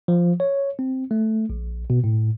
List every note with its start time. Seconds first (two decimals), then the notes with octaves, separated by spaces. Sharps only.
0.08 F3
0.40 C#5
0.79 C4
1.11 A3
1.50 A#1
1.90 B2
2.04 A2